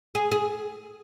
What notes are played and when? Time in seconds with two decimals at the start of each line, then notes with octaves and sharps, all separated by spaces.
0.15 G#4
0.31 G#4